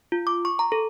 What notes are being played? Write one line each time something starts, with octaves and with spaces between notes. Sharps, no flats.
F4
D6
C#6
A#5
A4